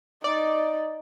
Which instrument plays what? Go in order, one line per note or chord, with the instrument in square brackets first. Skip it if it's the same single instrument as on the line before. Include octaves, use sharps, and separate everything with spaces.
[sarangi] D#4 [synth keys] D5